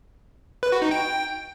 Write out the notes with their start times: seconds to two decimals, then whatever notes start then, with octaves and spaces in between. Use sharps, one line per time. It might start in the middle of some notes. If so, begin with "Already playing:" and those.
0.63 B4
0.72 F#4
0.82 D#4
0.91 G5